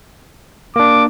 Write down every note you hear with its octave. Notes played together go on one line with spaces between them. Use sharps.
A#3 D4 D6